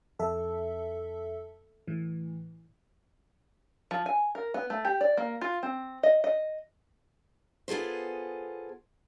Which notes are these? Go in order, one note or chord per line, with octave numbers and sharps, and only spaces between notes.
F2 A4 E5
A2 E3
F3
G#5
A#4
B3
A3
G4
D5
A#3
F4
C4
D#5
D#5
B3 F4 G#4 A4 C5